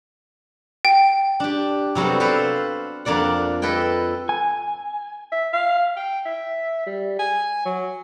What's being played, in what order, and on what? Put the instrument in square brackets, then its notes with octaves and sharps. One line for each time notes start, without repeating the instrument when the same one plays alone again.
[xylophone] G5
[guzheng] D4 G4
C3 F#3 G3 B3 A4
A4 B4 C5 F5 G5
F2 A#3 D4 D5 F#5
A4 B4 D#5 G5 G#5
[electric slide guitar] G#5
[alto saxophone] E5
F5
G5
E5
G3
G#5
F#3